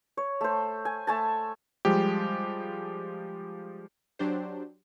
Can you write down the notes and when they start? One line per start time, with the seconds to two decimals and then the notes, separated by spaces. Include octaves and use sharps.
0.17 C#5
0.41 A3 C5
0.85 G#5
1.07 A3 G#5 A5
1.85 F3 G3 G#3 G4
4.19 F#3 D4 G4 C5